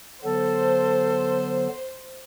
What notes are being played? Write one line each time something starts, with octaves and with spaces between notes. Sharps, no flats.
D3 F#3 B3 A4 C5